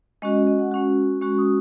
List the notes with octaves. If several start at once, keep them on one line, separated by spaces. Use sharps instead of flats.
G#3 C#4 F#4 D#5
D#5
F#5
G#3 C#4 F#4
G#3 C#4 F#4 C#6
D#6